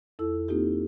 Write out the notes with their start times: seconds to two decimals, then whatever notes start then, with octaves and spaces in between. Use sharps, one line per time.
0.19 F2 E4 A4 E6
0.48 A#3 C4 D#4 F4 G4